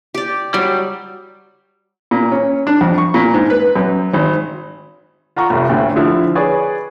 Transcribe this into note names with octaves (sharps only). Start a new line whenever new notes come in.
G4 D5
F#3 G3
A#2
C#4
D4
F2
C#6
A#2
G#2
B4
F#2
G#1
F4 F#5 A#5 C#6
F1 C2
A1 D2 A2 D3
D3 F3 E4
G#4 B4 C#5 D5